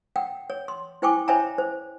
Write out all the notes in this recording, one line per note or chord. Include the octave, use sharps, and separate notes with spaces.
F#5 G5
C#5
C6
E4 C5 G5 G#5 C#6 D6
C5 C#5 E5 G5 G#5 A#5
C5